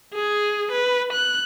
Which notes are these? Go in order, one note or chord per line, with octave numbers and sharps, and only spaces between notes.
G#4
B4
F#6